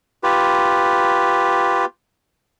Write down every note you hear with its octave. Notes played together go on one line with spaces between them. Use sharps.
F4 G4 B4